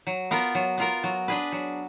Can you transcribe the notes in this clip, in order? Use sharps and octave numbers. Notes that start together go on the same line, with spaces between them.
F#3
B3 F4 A#4
F#3
B3 F4 A#4
F#3
D4 G#4 B4
F#3